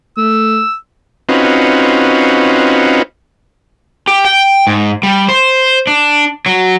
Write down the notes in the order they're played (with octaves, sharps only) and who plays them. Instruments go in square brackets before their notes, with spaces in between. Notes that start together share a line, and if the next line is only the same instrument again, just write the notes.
[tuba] A3 [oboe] E6
[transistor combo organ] C4 C#4 D#4 F4 F#4 B4
[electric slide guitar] G4
G5
G#2
G3
C5
D4
F#3